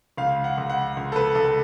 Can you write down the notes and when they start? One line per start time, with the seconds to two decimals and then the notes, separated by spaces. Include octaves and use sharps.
0.17 C#2 F5
0.44 F#5
0.57 C#2
0.69 F#5
0.97 C#2
1.12 A4
1.16 B4
1.35 C#2 A4